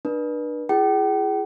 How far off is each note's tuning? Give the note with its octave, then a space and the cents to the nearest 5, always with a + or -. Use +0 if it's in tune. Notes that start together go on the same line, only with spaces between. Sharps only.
D4 +30 B4 -35
F4 -40 G#4 +0 G5 -45